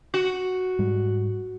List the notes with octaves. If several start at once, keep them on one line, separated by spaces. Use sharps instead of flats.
F#4
G#2 G3 G#3